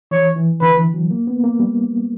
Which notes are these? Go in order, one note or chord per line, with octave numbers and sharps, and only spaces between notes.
E3 C#5
E3
D3 B4
E3
F#3
A#3
B3
A#3
G3